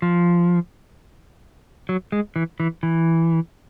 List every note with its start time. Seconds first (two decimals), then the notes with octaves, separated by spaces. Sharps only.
0.02 F3
1.89 F#3
2.12 G#3
2.36 E3
2.60 E3
2.83 E3